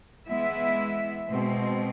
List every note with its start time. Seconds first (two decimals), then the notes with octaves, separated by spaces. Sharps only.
0.28 E3 G#3 B3 E4 E5
1.29 B2 G#3 C4